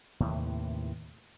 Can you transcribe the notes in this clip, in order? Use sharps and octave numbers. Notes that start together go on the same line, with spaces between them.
D#2 A2 C3 E3